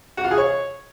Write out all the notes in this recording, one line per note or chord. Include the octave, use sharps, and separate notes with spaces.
F#4
F4
G#4
C#5